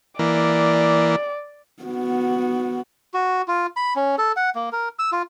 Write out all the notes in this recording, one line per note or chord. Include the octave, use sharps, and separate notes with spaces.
E3 A#3 D5
B3 F#4
F#4
F4
B5
C#4
A4
F#5
A#3
A#4
E6
F4